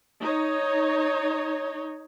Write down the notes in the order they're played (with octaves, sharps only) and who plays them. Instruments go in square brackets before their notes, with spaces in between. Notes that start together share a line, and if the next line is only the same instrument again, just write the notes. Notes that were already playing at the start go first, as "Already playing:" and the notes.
[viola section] D#4 C#5